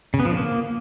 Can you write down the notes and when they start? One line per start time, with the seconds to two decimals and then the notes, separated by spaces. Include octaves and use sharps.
0.14 C#3
0.20 B3
0.25 F3
0.31 D3
0.37 A#3